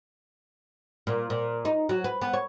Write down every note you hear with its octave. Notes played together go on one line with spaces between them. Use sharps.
A#2
A#2
D#4
F#3
B4
B3
C#5